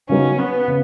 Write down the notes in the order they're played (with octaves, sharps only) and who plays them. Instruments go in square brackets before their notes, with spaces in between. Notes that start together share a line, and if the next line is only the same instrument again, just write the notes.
[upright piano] C#3 F#3 B3 D#4 [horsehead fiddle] C#4
[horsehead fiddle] B3
[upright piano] C#3